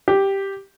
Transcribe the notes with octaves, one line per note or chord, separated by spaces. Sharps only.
G4